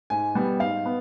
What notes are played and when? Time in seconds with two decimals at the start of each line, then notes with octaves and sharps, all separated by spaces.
0.10 G#2 G#5
0.35 G3 B3
0.60 G#2 F5
0.86 B3